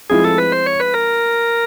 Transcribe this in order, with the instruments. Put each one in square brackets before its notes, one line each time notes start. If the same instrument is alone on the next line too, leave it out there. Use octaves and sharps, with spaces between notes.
[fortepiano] F3 G#3 C4 E4 [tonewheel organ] G#4
[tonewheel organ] A4
B4
C5
C#5
B4
A#4